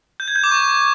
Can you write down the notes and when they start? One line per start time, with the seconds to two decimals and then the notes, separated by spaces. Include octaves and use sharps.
0.20 G6
0.28 G#6
0.36 G6
0.44 D6
0.51 C#6